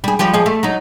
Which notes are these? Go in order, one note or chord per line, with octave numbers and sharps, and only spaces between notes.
G3 G#4
F3 G3 G4
F3 G#4 D#5
A3
F#3 D#4